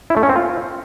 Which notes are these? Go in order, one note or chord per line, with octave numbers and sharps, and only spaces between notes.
E4
A3
C#4
C4
F4